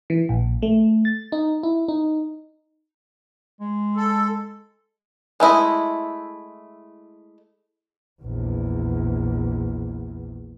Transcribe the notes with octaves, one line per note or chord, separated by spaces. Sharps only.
E3
A#1
A3
A6
D#4
E4
D#4
G#3
A4
G#3 A3 E4 D#5
A#1 E2